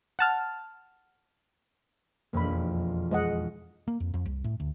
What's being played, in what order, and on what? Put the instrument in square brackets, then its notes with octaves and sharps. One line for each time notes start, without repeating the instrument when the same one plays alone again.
[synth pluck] F#5 A5 F6
[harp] E1 B1 F2 [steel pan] A#3 B5
[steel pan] G#3 D#5 F#5
[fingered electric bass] A#3
F2
F2
C2
A2
D2